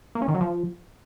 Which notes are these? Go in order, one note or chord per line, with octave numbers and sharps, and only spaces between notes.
A#3
C#4
D#3
F#3
F3